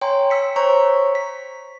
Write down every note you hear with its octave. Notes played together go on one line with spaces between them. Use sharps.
C#5 G5 G#5 A#5 C6
E6 B6 C#7
C5 C#5 A#5 C#6
B6